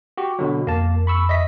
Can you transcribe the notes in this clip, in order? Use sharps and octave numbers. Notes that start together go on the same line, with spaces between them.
F#4 G4
B2 D3 F#3
F2 A#3 A5
B5 C#6 E6
D#5 E5 B6